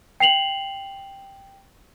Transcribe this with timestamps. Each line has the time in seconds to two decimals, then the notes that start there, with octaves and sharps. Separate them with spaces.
0.20 G5 C7 F7 F#7